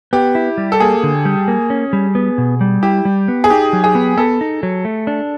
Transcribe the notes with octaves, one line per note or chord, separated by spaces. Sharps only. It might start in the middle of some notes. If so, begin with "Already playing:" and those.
B3 G4
E4
G3
A4
A#3 G#4
D3
G3
A#3
C#4
G3
B3
B2
G3
E4 G4
G3
B3
G#4
D#4 G4
F#3
G#4
B3
B3 A4
D#4
F#3
A3
D4